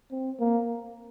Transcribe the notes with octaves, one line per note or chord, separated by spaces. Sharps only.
C4
A#3